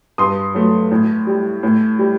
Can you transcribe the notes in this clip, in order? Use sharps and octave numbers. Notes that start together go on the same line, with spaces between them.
G2 C6 D#6
F#3 A3
A2
G3
A2
G3